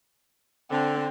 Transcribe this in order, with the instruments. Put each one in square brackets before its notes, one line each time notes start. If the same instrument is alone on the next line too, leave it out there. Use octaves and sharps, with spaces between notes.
[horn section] D3 [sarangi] C4